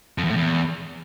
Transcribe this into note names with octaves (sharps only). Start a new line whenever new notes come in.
F2
E2
A2
E2